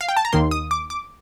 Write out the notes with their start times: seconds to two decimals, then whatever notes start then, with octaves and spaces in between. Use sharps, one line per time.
0.01 F5
0.09 G5
0.17 A5
0.25 A#5
0.32 D#2 D#3 A#3 C6
0.51 D#6
0.71 D6
0.90 D6